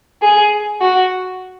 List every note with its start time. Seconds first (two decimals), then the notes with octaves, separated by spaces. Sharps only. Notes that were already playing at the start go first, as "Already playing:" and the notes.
0.22 G#4
0.81 F#4